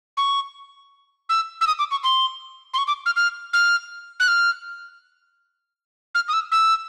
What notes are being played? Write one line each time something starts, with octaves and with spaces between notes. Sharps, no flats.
C#6
E6
E6
D#6
D6
C#6
C6
C6
C#6
D6
F6
F6
F6
F#6
F6
F6
D#6
E6
E6